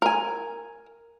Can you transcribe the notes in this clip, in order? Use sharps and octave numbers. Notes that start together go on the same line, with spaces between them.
A#4 G#5